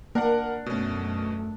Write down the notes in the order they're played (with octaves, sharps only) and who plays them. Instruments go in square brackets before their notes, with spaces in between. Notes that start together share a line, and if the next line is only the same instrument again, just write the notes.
[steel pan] A#3 [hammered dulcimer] D4 [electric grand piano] A#4 F#5
[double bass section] F#2 A3 [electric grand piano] B2 C#4